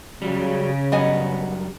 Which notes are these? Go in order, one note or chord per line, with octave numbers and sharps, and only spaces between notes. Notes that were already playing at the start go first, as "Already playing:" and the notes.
C#3 F#3 G3
F#2 G3 B3 D#5 G#5